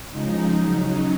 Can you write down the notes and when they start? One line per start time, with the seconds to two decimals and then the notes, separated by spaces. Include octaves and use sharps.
0.11 C#3 F3 G#3 D#4
0.54 C#3 F#3